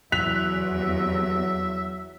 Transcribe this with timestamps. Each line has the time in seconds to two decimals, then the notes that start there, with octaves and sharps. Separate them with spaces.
0.12 E2 F#3 E5 F#6 B6 F7